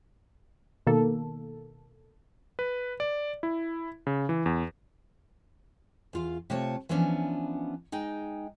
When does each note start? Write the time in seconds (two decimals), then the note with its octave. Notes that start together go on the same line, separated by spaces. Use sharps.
0.87 B2 D#3 A#3 A4
2.59 B4
3.00 D5
3.43 E4
4.07 C#3
4.29 E3
4.46 E2
6.13 E2 F4 F5
6.50 C3 A3 F4 C#5 A5
6.89 E3 F3 B3 C#4 D4
7.92 G#3 D#4 G5